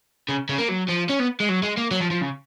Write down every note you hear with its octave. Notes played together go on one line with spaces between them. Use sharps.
C#3
C#3
A#3
F#3
F3
C#4
B3
G#3
F#3
G#3
A#3
F#3
F3
F3
C#3